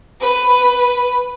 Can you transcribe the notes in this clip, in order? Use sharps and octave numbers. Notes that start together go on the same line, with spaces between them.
B4